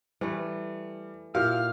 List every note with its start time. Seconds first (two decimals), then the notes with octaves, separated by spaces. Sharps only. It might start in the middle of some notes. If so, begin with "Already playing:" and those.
0.21 E3 G3 A3
1.35 A#2 E4 F#4 G4 F5 F6